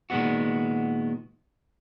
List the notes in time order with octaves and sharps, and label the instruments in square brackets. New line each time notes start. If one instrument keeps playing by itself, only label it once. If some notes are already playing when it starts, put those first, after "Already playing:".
[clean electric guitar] A#2 D#3 G#3 B3 F#4